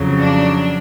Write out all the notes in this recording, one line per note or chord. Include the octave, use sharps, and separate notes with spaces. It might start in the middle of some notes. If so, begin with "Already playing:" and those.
Already playing: F2 C#3 F#3
D4